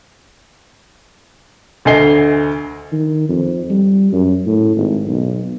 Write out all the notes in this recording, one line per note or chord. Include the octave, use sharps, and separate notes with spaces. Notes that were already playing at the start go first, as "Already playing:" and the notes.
D2 A4 D#5 G#5 C7 G7
D#3
F2
G3
F#2
A2
G#1
B1